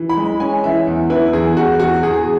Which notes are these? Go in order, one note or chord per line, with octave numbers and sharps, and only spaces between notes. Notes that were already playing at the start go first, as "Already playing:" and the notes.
Already playing: E3
B5
G#3
C#4 G#5
E3 E5
E2
E4 B4
E2 G#4
E2 F#4
E2 F#4
E2 G#4